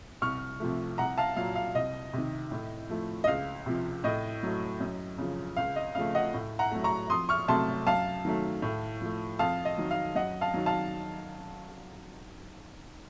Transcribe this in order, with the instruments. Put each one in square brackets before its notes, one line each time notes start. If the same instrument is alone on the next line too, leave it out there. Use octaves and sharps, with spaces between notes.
[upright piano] C2 C#6 F6
C3 F3 A3
C2 F#5 A#5
F5 A5
A#2 F#3 F5
F5
C2 D#5
C3 D#3
A2
F3 A3
D#5
C#2 F5
C3 F3
A2 D#5
F#3 A3
F#2
C#3 F3
C#2 F5
D#5
C#3 F3 A3 F5
D#5 F#5
A2
F#5 A#5
F#3 A3
A#5 C#6
F2 C6 D#6
C#6 F6
C3 F#3 A3 A5 C6
F#2 F5 A5
D#3 F#3 A3
A2
F3 A3
F2 F5 A5
D#5
D#3 F#3
F5
F#2 D#5 F#5
F5 A5
D#3 F#3
F5 A5